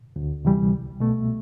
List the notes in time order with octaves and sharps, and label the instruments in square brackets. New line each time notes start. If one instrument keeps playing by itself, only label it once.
[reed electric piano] D2
C3 E3 G3
C2
B2 A3